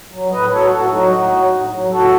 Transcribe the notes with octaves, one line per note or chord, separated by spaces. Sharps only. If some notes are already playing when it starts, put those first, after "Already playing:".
F#3
A2 B4 D#5
F#3 A4 C#5
A2 F#4 A4
F#3 D#4 F#4
A2
F#3
A2
F#3
A2 F#4 A4